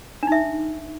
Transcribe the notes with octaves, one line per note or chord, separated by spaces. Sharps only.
D4 D#4 E5